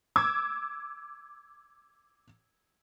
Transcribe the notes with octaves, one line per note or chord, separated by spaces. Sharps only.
D6 E6 G#6